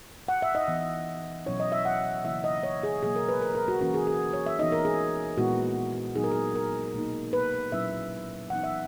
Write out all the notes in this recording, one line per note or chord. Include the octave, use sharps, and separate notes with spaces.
F#5
E5
D#5
E3 B3 D#4
B2 F#3 C#4 E4 C#5
D#5
E5
F#5
C#3 E3 A#3 E4 E5
D#5
C#5
G#4
B2 F#3 A#3 G#4
A#4
B4
A#4
A#4
F#4
E3 A#3 C#4 F#4
G#4
G#4
C#5
E5
E3 B3 D#4 D#5
A#4
G#4
A#2 G#3 B3 E4 F#4
A#2 F#3 B3 D#4 G#4
A#4
G#4
A#4
B2 A#3 D#4
B4
A#2 F#3 C#4 E4 E5
E3 B3 D#4 F#5
E5